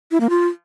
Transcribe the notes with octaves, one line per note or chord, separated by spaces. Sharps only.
E4
A#3
F4